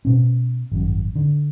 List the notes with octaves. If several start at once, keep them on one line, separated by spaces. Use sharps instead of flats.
B2 C#4
G#1 F#2
D3